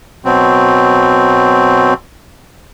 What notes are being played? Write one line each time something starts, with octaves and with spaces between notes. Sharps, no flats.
B2 F#3 C4